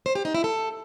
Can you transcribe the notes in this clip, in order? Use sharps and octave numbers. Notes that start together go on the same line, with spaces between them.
C5
G4
D#4
E4
A4